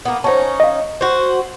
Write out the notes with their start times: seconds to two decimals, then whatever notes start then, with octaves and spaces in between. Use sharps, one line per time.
0.05 A#3 B3
0.24 C#4 D#4 C5 F#5 A5
0.60 D#5 F5
1.01 F#4 C5